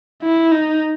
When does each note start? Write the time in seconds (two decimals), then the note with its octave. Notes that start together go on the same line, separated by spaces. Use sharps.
0.22 E4
0.52 D#4